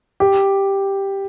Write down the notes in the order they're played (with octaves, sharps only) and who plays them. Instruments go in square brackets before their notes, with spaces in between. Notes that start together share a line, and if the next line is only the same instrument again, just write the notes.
[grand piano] G4